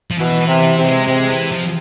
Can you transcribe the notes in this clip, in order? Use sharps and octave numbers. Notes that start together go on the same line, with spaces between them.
F3
B2 E3
E3
C3
E3
C3
G#3
C3 G#3
E3
F3